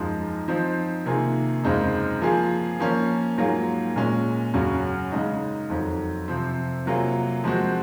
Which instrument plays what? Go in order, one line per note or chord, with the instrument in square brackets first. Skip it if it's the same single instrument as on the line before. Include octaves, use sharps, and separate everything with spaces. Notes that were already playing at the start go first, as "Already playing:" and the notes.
Already playing: [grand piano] F#2 F3 G#3 D#4
F3 C4 D#4
C3 D#3 A#3 F4 G#4
F#2 C#3 G#3 C4 D#4
F3 A#3 F4 G#4
F3 A#3 C#4
G#2 F#3 A#3 F4 G#4
A#2 G#3 C#4
F#2 C#3 F#3 C#4 F#4
C#3 G#3 D#4
F2 D#3 F#3
C3 F3 C4
C3 F#3 A#3 F4 G#4
F3 G#3 C4 F#4